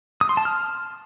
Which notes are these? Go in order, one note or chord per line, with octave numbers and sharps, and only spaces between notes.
D#6
C6
A5
F6